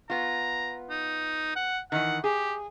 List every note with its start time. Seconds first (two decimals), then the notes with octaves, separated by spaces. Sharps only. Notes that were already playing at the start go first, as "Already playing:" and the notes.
0.10 B3 F4 A#5
0.90 D#4
1.56 F#5
1.92 D#3 E3 F#5
2.24 G4 G#4